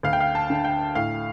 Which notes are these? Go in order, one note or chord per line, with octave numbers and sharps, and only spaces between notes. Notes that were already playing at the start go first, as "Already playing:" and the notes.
D2 F5
G5
F5
A5
D3
G5
A2 F5